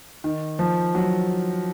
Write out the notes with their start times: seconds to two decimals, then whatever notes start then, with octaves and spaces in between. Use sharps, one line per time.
0.24 D#3
0.59 F3
0.95 F#3